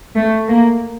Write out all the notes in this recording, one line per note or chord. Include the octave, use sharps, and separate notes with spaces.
A3
A#3